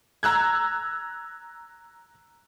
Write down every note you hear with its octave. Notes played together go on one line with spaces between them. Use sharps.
A#5 E6 F#6 G#6